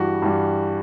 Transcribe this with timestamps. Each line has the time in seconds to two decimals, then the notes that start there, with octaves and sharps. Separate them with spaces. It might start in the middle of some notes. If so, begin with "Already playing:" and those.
Already playing: G2 E3 G3 F#4
0.22 G2 E3 G3